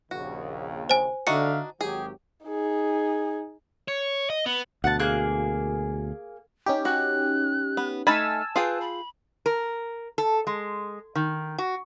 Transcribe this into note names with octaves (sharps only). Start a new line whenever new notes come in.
A#1 D#2 C#3 F#4
C5 G#5
D3 D4 D#4 F#4 E5 F5 C#7
G#1 F#3 G4 G#4
D#4 G#4
C#5
D#5
B3
D2 B2 F#5 A5
A#3 G#4 F#6
C#4 D#4 G4
F#4 F#6
B3
A3 D#4 G#5 A5 B5 E6 F6
F4 G#4 B4 G5
B5
A#4
A4
G#3
D#3
F#4